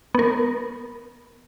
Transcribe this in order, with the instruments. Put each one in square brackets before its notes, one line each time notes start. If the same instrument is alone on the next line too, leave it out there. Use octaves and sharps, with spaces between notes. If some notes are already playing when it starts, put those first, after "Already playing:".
[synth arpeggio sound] B3 A#4